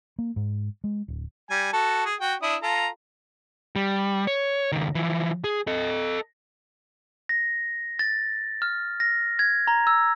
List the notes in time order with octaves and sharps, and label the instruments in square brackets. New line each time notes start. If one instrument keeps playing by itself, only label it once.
[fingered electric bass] A#3
G#2
G#3
D1
[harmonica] G3 G#5
F#4 A4
G#4
F#4 G5
D4 E4 D#6
F4 A4 A#5
[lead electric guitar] G3
C#5
C#2 D#3
E3 F3
G#4
A4 D#5
[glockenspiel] A#6
A6
F6
A#6
G#6
A#5
E6